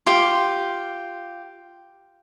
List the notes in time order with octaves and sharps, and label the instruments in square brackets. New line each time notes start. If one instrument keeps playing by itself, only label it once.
[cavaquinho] F4 G4